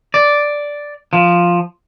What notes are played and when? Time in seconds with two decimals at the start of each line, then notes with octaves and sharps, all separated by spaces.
0.14 D5
1.13 F3